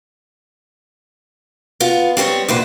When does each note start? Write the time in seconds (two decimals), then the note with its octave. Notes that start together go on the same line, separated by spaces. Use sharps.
1.80 B3 F4
2.17 G3 C4 G#4 C#5 D#5
2.48 E2 A#2 B4 C5